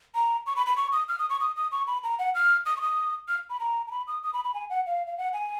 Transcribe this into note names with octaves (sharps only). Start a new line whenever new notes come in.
A#5
C#6
B5
B5
C#6
D#6
F6
D#6
C#6
D#6
D#6
C#6
B5
A#5
F#5
F6
D#6
C#6
D#6
F6
B5
A#5
A#5
B5
D#6
D#6
B5
B5
G#5
F#5
F5
F5
F#5
G#5